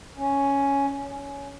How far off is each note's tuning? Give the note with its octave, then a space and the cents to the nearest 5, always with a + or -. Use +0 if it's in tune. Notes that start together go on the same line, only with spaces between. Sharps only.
C#4 +5
C#4 +15